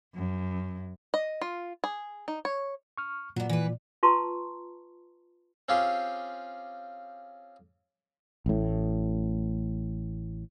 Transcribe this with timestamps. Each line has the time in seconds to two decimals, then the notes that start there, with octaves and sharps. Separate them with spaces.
0.15 F#2
1.14 D#5
1.41 F4
1.84 G#4
2.28 D#4
2.45 C#5
2.98 C#6 F6
3.36 A#2 F#3 B3 D5
3.49 E3 B4
4.03 F4 B4 A5 A#5 C6 C#6
5.69 C4 C#4 F4 G4 G#4
8.46 A1 A2